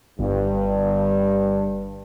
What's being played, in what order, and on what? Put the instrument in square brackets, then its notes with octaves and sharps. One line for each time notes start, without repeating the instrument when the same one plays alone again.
[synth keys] G1 [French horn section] G2